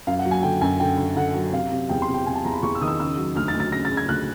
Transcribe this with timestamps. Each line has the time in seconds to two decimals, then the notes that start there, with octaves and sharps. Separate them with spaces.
0.07 F#2 F5
0.19 F#5
0.25 F#3
0.31 G#5
0.43 D3 G5
0.61 F#2 G#5
0.80 D3 G5
0.98 D3
1.16 D3 F#5
1.34 F#3
1.52 C3 F5
1.72 C3
1.89 E2 G5
2.02 C6
2.08 C3
2.14 G5
2.26 C3 G#5
2.35 A5
2.45 E2 A#5
2.54 B5
2.63 E2 C#6
2.75 E6
2.81 D#3 D#6
2.88 E6
2.99 C#3 E6
3.17 F#3
3.36 D2 F6
3.48 A6
3.54 D2
3.60 A6
3.72 C#3 A#6
3.85 A6
3.91 C#3
3.97 G#6
4.09 D2 F#6